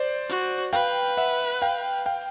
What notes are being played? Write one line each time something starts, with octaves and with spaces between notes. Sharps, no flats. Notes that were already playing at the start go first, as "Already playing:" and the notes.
Already playing: C5 D5
F#4
B4 F5 G5
E5 F#5
F5 G5
F5 G5